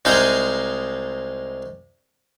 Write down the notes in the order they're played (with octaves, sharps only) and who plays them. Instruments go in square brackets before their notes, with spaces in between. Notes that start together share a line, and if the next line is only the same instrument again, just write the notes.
[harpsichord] C2 G#3 D#4 C5 F5 G#5